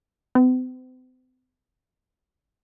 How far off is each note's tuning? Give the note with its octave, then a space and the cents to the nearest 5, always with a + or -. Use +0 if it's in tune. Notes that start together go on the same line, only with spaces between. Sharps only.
C4 -45